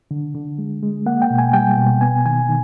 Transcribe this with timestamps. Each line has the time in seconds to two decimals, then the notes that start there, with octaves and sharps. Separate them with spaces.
0.11 D3
0.35 D3
0.59 G#3
0.83 G#3
1.06 A#3 F#5
1.22 G5
1.31 B2
1.38 G#5
1.53 G3 G5
1.77 B2
2.01 B3 G#5
2.26 D#3 G#5
2.49 D#3